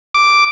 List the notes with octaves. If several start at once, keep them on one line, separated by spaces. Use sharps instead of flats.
D6